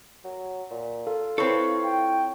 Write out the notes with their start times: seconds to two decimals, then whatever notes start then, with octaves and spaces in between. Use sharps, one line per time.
0.24 F#3
0.70 A#2
1.07 F4 A4
1.38 C4 E4 A4 B4 C#5 C#6
1.84 G5